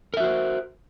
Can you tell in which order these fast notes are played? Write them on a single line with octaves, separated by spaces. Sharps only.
A#4 E5 F#4 C5